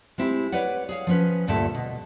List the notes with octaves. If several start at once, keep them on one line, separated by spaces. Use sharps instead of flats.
G#3 C4 E4 G4
B4 C#5 D5 F#5
G#4 C#5 F5
F3 C#4 B4
D2 G2 A#2 D3 A4 E5
B2